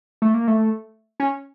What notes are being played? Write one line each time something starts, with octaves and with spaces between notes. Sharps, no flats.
A3
A#3
A3
C#4